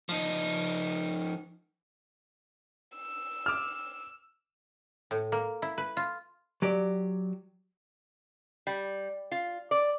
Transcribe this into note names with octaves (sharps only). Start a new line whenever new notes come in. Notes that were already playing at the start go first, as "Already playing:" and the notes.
F3 D#4
E6
D6 F6
A2
A#3
E4
B4
F4
F#3 G4 D5
G3
F4
D5